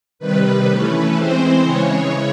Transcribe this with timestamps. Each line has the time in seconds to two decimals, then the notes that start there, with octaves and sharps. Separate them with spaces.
0.19 C3 D#3 G3 B4
0.68 E3 A3 C#4 B4
1.15 E3 G#3 C4 C5
1.63 C#3 E3 G#3 C#5